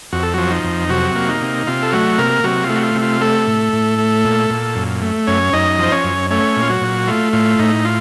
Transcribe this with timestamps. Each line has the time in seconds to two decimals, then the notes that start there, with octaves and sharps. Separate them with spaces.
0.13 F2 F#4
0.23 A4
0.34 F3 F#3 F#4
0.51 D#4
0.64 F2
0.89 C3 F#3 F#4
1.15 A#3
1.28 D#4
1.41 C3
1.67 C3 F4
1.82 A4
1.93 F#3 A3 F#4
2.18 C3 A#3 A#4
2.44 C3 F#3 F#4
2.64 F4
2.69 A3
2.76 F#4
2.83 F4
2.95 C3
3.02 F4
3.21 A3 A4
3.47 A2
3.73 A2
3.98 A3
4.25 A#2
4.50 A#2
4.75 F#2
5.02 A3
5.27 F#2 C#4 C#5
5.53 F#2 D#4 D#5
5.79 F3 C5
5.92 C#4 C#5
6.04 F#2
6.30 A3 C#4 C#5
6.56 A#2
6.62 F4
6.70 F#3 F#4
6.81 A#2
7.07 A3 F4
7.33 A2 F4
7.59 A2 D#4
7.85 F4